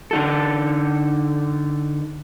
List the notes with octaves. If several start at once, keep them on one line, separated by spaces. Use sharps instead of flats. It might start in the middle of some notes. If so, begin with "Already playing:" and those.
D3 D#4 A4